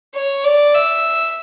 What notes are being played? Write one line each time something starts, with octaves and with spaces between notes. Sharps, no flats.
C#5
D5
E5